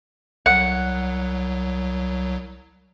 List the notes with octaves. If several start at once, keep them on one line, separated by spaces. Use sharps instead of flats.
C2 F#3 F#5